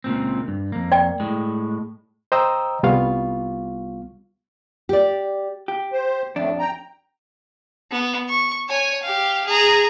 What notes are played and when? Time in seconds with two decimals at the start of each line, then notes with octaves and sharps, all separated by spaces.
0.04 C#2 A#2 C4
0.48 G2
0.72 F2 A#3
0.92 D5 G5
1.20 A2 G#3
2.32 C5 D#5 G5 A#5 D#6 E6
2.83 C2 G3 B3 F4 F5 C#6
4.89 G4 D5
5.68 G4
5.92 C5
6.36 F2 A2 A3 D4
6.59 G5 A#5
7.91 B3
8.29 C#6
8.68 C#5 G#5
9.03 G4 F5
9.46 G#4 A#5